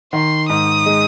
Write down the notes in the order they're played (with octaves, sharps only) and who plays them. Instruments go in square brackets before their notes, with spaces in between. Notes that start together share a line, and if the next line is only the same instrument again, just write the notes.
[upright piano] D#3 [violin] C6
[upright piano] G#2 [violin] D#6
[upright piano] G#3